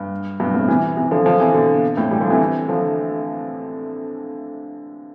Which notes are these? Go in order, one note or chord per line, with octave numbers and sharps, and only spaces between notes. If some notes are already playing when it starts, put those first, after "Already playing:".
Already playing: G2
G2 B2
A2 C3
C3 E3
C3 E3
D3 F3
D3 F3
C3 E3
B2 D3
F2 A2
E3 G3
D3 F3
C3 E3
D3 F3